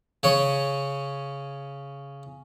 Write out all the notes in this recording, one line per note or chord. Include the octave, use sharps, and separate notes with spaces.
C#3 C#4 C#5